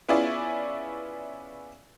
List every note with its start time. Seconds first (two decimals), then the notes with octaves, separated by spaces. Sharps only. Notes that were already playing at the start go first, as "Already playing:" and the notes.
0.09 B3 C#4 E4 F4 G#4 D5